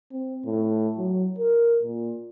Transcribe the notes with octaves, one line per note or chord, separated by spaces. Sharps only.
C4
A2
F#3
A#4
A#2